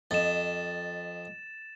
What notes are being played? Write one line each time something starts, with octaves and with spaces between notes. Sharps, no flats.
F2 D#5 A6 E7